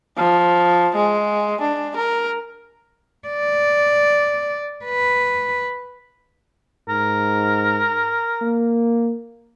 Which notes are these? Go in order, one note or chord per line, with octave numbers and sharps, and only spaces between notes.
F3
G#3
D4
A#4
D5
B4
G#2 A#4
A#3